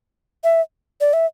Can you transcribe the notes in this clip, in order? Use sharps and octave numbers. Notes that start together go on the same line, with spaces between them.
E5
D5
E5